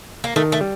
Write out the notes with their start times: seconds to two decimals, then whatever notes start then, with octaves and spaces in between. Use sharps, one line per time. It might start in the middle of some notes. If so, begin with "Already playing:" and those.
0.24 A#3
0.36 D#3 A3
0.52 A3
0.61 G3